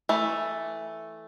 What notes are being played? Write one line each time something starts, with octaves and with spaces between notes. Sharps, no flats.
E3 A3